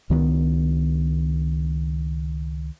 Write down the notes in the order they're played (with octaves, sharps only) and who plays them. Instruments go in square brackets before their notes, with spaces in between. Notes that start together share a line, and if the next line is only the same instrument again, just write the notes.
[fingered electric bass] C#2 D#3 A3 B3